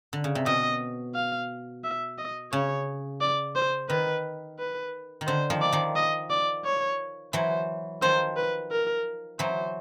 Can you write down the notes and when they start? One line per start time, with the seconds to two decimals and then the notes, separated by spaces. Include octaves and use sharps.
0.13 D3
0.24 C#3
0.35 C3
0.46 B2 D#5
1.15 F5
1.84 E5
2.18 D#5
2.52 C#3 C#5
3.21 D5
3.56 C5
3.89 D#3 B4
4.59 B4
5.21 D#3
5.27 D3 C5
5.50 D#3 F3
5.62 D5
5.72 D#3 F3
5.96 D#5
6.30 D5
6.65 C#5
7.33 E3 F#3 C5
8.02 D#3 F3 C5
8.37 B4
8.71 A#4
9.39 E3 F#3 C5